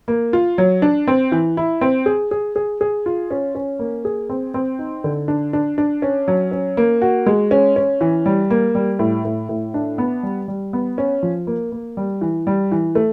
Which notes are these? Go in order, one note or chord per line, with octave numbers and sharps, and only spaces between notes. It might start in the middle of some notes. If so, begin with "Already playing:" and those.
A#3
F4
F#3
D4
C4
E3
E4
C4
G#4
G#4
G#4
G#4
F4
C#4
C#4
A#3
G#4
C4
C4
D#4
D3
D4
D4
D4
C#4
F#3
C#4
A#3
F#4
G#3
C#4
C#4
E3
G3
A#3
G3
A2
A2
A2
D4
B3
G3
G3
B3
C#4
F3
A#3
A#3
G3
E3
G3
E3
A3